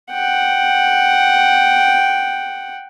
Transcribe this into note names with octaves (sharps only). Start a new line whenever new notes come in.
F#5 G5